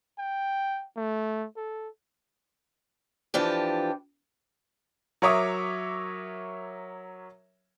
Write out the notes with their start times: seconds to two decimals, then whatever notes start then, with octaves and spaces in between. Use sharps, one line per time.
0.18 G5
0.97 A3
1.56 A4
3.34 E3 F3 D4 G4
5.22 F#3 A#4 C#5 E5 D6 D#6